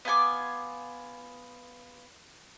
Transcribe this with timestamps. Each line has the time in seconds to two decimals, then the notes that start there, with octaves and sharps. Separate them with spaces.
0.05 B3 F4 G#5 D6